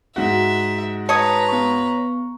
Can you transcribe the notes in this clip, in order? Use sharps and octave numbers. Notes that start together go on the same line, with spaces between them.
G#2 F#4 E5
B4 C#5 A5 A#5 D#6
B3 C#6